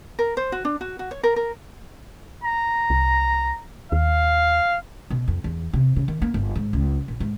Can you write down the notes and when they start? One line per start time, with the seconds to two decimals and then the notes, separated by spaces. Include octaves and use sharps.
0.19 A#4
0.37 C5
0.52 F#4
0.65 D4
0.81 F#4
0.99 F#4
1.11 C#5
1.23 A#4
1.36 A#4
2.44 A#5
2.90 C2
3.92 D#2 F5
5.10 B2
5.28 F2
5.44 E2
5.73 C3
5.96 C#3
6.08 D#3
6.22 A#3
6.34 G1
6.56 G#2
6.73 C#2
7.08 A#1
7.20 G#2